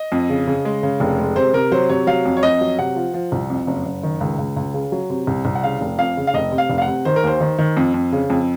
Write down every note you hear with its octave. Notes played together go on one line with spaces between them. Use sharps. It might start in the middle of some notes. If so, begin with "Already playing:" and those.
Already playing: D#5
F2
C#3
C#3
G#3
C#3
F1
G#3
C3 C5
C3 A#4
F#3 C5
C3 C#5
F#3 F5
F2
C#5
F2 D#5
F#3
C3 F#5
F3
F3
C2
F2
F#1
F#1
D#3
C#2
C#2
C#2
C#3
F#3
C3
C2
C2
F#5
C#3 F5
F1
F2 F5
C#3
F5
F1 D#5
C3
F5
F1
F5
F#5
C3
D#3 C5
A#4
D#2 C5
D#3
D#3
F2
F2
C#3
F2